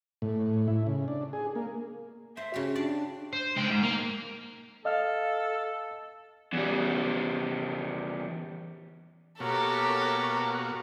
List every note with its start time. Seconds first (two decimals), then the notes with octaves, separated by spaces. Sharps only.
0.22 A2
0.68 E4
0.87 C#3
1.08 D4
1.33 G#4
1.55 A#3
2.37 C5 E5
2.54 C#3 F#4 G4
2.76 D4 D5
3.33 C5
3.56 C#2 G5
3.70 G#2
3.83 A#3
4.85 A4 D#5 F5 F6
6.53 E2 G3
9.40 B2 A#3 F#4 G4 A4 A#4 C#5